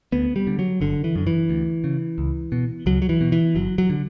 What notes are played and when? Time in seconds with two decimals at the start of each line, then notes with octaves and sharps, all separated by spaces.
0.12 D2 B3
0.36 G3
0.47 D3
0.59 F#3
0.81 G1 D3
1.04 E3
1.16 F#2 D3
1.27 E3
1.49 D2
1.84 C#3
2.18 C#2
2.52 B2
2.86 C#2 F#3
3.02 F#3
3.09 E3
3.21 B2
3.32 E3
3.55 G1 F#3
3.78 F#3
3.90 D3